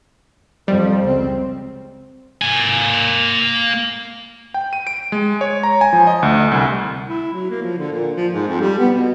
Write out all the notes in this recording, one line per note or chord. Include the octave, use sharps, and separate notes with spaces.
F2 F3 G3
C#2 C4
A#3 G#5
G5
D#7
D7
G#3
C#5
A#5
G#5
F3
D#5
D2
C2
E4
F#3
A#3
F3
D3
A#2
F3
G#2
F2
G3
B3
B2